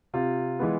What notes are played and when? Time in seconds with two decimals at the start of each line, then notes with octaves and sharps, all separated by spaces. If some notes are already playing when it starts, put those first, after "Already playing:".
0.14 C3 F4
0.59 E3 G#3 B3